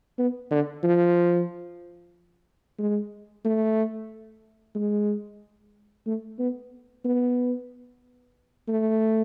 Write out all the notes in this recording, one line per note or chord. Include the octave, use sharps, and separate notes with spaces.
B3
D3
F3
G#3
A3
G#3
A3
B3
B3
A3